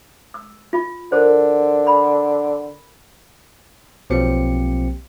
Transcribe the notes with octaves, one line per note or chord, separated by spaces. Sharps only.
E6
F4
D3 A#4 C5
B5
B1 F3 A#3 C4 G4 C#7